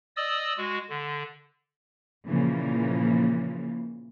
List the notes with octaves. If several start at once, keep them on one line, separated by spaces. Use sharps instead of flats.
D5 D#5 D#6 E6
G#3 F#4
D3
A#2 C#3 E3 F3 A#3